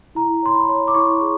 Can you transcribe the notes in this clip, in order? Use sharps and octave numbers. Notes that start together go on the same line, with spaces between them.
E4 A#5
C#5 C6
B5
C#5
D6
E4 C#6
G#4